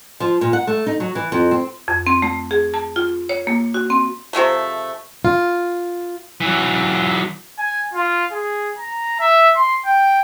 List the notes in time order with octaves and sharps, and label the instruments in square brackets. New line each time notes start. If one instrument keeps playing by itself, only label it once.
[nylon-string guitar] F3
A#2
F#5
A3
D#4
F#3
E3
F2
C4
[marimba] F2
C4
A3
G#4
A5
F4
C#5
A#3
F#4
C4
[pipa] C3 F3 G#3 A3
[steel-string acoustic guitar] F4
[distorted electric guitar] E3 F#3
[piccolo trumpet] G#5
F4
G#4
A#5
E5
C6
G5